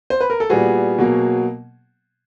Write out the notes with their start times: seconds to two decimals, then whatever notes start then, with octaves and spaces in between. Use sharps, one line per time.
0.10 C5
0.21 B4
0.30 A#4
0.40 A4
0.50 A#2 G3 B3 F#4 G#4
0.98 B2 F#3 A#3